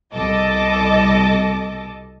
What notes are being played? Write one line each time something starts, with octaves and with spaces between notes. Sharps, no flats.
C2 B2 A4 D#5 A5 D6